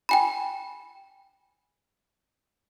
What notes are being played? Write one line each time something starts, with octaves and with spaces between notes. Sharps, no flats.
G5 G#5 B5